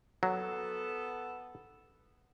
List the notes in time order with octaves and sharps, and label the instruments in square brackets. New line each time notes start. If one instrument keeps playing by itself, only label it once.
[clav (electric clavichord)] F#3 [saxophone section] B3 A4